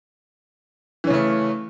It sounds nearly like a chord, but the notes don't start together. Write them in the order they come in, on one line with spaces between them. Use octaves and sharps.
E3 C#4 C#3 A3